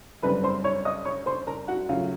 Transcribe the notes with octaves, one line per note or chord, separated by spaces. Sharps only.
F#2 D3 G3 C4 B4 B5
C5 C6
C#5 C#6
D#5 D#6
C#5 C#6
C5 C6
A#4 A#5
F#4 F#5
D2 C#3 F#3 F4 F5